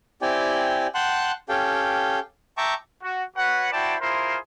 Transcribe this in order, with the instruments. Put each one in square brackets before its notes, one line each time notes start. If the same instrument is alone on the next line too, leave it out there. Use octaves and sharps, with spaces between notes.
[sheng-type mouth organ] C4 E4 G4 D5 G5 G#5
F#5 G5 A5 C6 F#6
C#4 G4 A4 F5 G5
E5 G5 A5 A#5 C#6 D6
[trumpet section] F#4
F#4 B4 C#5 F#5
E4 F#4 C5 D5 G5 A5
E4 F4 G#4 A#4 C5